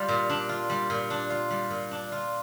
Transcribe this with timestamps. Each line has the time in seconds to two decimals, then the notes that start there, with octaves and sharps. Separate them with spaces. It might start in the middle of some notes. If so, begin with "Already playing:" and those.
Already playing: G3 D4 F4
0.08 A#2
0.29 D4
0.49 F4
0.70 G3
0.90 A#2
1.10 D4
1.30 F4
1.50 G3
1.70 A#2
1.91 D4
2.12 F4